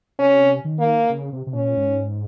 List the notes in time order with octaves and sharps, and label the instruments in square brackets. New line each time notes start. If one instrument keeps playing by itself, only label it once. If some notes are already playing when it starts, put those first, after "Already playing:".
[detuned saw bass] C3 [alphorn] C#4
[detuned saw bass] D#3
[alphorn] A#3
[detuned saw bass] C#3
C3
C3
[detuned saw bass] A#2 [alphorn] C#4
[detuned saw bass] G#2